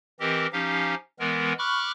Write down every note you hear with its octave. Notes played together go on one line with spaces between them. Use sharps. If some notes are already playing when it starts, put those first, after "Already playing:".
E3 C4 G4 A#4 D#5
F3 C#4 D#4 G4 F5
E3 G#3 B3 A#4
B5 C#6 D6 F6 F#6